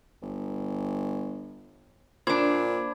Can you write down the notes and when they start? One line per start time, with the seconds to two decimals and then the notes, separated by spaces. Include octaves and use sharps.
0.22 G1
2.27 A#2 D4 C5 B5 D6 G#6